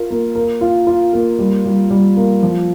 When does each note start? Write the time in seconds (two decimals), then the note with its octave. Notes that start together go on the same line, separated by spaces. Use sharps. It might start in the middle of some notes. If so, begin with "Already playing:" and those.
Already playing: F4 A#4
0.10 A#3
0.35 A#4
0.61 F4
0.87 F4
1.13 A#3
1.39 G3
1.66 G3
1.91 G3
2.17 A#3
2.43 F3